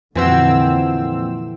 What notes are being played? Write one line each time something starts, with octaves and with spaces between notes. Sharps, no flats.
F2 A#2 D3 E3 A#3 C4 F#4 E6